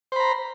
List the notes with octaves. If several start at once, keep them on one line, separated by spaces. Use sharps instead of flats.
C5 A#5 B5